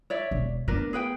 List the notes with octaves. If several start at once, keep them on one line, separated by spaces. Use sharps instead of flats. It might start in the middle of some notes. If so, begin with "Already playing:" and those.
C#5 D5 E5
E1
A3 B3 D4 A#4 B4
G#4 B4 G5